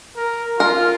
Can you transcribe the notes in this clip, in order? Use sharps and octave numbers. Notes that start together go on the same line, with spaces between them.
A#4
F4 A#4